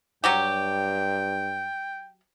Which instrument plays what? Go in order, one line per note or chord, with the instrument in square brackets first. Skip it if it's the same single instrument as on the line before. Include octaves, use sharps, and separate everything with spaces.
[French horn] G2 [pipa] F#3 F#4 G4 [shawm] G5